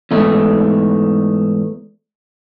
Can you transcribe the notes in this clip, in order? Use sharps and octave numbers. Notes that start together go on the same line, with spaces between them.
E2 G#2 A3 D#4